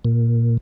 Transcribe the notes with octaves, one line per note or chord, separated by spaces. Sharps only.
A#2